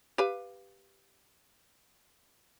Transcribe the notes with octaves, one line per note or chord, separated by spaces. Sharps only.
G4 B4 F5